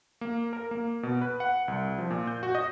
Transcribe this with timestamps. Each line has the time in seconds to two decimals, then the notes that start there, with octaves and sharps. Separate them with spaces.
0.21 A#3
0.53 A#4
0.71 A#3
1.03 B2
1.22 B4
1.40 F#5
1.68 C2
1.98 F3
2.10 A#2
2.27 G6
2.43 F#4
2.55 D#5